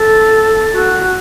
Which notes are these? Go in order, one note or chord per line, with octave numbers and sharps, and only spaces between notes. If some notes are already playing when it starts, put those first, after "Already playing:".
Already playing: A4
F#4